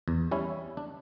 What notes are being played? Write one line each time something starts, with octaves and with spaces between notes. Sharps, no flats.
E2
G3 C#4 E4
D4